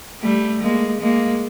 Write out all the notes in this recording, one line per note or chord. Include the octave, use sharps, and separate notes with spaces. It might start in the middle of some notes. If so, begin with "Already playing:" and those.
G3 A3
G#3 A#3
G#3 A#3